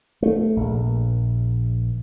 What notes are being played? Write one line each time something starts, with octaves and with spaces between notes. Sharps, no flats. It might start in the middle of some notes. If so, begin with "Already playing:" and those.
A3
A#1